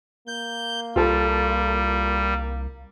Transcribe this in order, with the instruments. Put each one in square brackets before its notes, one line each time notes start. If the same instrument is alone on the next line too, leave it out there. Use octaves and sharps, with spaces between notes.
[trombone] A#3 [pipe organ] G6
[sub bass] C2 [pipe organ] G3 [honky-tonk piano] F4 A4